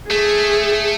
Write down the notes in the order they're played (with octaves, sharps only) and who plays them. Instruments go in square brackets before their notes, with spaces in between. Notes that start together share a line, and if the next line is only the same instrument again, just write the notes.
[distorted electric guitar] A3 [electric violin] G#4